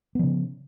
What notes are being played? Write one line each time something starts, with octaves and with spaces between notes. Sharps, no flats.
C#3 F3 B3